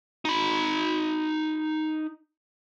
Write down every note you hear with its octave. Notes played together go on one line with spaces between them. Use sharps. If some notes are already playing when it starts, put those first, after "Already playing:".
D#4 B5